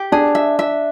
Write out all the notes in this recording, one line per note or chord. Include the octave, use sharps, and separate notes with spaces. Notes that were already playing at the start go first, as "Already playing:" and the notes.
Already playing: G4
D4 G#4
E5
E5